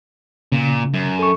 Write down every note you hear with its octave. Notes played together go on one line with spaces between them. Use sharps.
A#2 C#3
F#2
A4 C#6